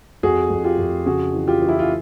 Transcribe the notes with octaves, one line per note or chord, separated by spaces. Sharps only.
F2 F#4 G#4
F2
F4 G4
F2
C#3 F#4 G#4
E3
F4 G4
E3
E4
F4